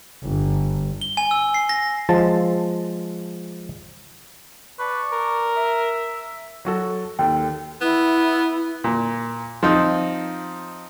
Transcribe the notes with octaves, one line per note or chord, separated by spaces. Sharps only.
G1
G7
G#5
E6
C7
A#6
F3 G#3 A5
B4 D5 A5 C#6
A#4
E5
F#3 F#4 A4
D#2 A4 G5
B3 E4
A#2
F3 C4 D#4